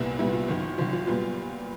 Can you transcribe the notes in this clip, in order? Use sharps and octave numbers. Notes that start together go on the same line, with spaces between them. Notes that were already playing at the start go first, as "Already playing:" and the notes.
Already playing: C2 A#2 G3 B3 E4
C2 A#2 G3 B3 E4
F4
F#1 F#2 D#3
F#1 F#2 D#3 F4
F4
A#2 G3 B3 F4